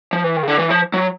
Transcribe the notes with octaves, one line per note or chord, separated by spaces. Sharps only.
F3
E3
D#3
C#3
D3
E3
F3
F#3